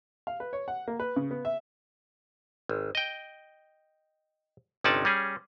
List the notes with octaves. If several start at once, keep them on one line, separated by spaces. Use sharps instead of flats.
F5
B4
C#5
F#5
A#3
B4
C#3
B3
E5
G#1
D#5 G5
G1 C3 C#4 D#4 D5 A5
G3 C#4 G#4